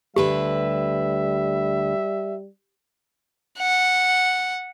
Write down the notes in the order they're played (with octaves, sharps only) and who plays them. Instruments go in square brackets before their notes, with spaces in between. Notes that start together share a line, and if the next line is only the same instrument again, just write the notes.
[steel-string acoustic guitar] D2 D3 B4 [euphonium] G3 [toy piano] G4 [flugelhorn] E5
[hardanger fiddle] F#5